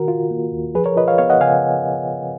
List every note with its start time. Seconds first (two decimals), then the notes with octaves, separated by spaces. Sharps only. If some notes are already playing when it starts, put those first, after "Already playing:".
Already playing: D#3 F#4 A#4
0.08 F4
0.31 A#3
0.52 D#2
0.75 F3 G#4 B4
0.85 A#4 C#5
0.96 F4 B4 D#5
1.08 C#5 F5
1.18 B3 C#5 F5
1.30 D#5 F#5
1.40 C#3 F5 G#5